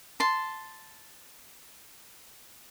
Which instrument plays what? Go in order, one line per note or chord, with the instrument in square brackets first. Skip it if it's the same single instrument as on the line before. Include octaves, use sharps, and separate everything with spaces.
[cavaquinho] A5 C6